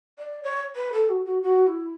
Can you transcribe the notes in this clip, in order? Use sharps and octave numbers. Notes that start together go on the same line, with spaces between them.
D5
C#5
B4
A4
F#4
F#4
F#4
E4